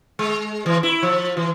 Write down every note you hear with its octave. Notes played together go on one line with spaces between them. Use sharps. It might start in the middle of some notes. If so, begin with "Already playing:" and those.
G#3
E3
E4
F3
E3